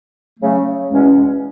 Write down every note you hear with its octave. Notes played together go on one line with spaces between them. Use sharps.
C#3 F#3 A3
E2 B2 G#3 C#4